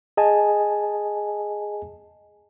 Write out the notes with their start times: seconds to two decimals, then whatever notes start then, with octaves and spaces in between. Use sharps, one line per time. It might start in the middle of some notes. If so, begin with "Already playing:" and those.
0.17 G#4 D#5 G#5 A5